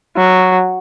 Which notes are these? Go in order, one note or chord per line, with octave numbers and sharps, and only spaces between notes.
F#3